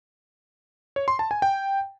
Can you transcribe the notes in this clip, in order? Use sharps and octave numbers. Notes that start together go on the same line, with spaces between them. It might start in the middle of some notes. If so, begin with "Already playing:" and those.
C#5
C6
A5
G#5
G5